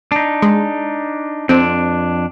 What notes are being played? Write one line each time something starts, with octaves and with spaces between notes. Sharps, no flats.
D4 D#4
G#3
F2 C4 D4